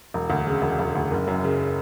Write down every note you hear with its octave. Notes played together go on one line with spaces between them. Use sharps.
E1
D2
C#3
E1
E1
D2
F#1
F#2
C#3